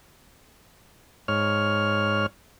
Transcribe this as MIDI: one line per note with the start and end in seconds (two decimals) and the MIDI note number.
1.28 2.26 44
1.28 2.26 73
1.28 2.26 89